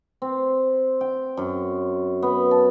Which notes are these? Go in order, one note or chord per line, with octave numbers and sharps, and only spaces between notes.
C4
G5
F#2
B3
A5